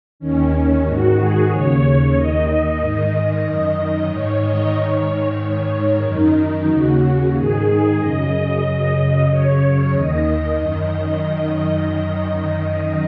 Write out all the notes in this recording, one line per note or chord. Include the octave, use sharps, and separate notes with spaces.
D#2 D#3 C#4
G#2 D#3 F#4
G#4
D#2 C#3 C#5
D#2 D#3 D#5
G#2 D#3
F#2 D#3 D#5
G#2 D#3 C#5
D#5
G#2 D#3 C#5
G#2 D#3
F#2 D#3 D#4
D#2 C#3 F#4
G#2 D#3 G#4
F#2 C#3 D#5
F#2 C#3
F#2 C#3 C#5
D#2 D#3 D#5
F#2 D#3